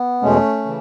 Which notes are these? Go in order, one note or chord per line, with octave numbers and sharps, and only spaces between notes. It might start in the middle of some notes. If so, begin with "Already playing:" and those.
Already playing: B3
E2 B2 G#3 A3 C#4
C#3 E3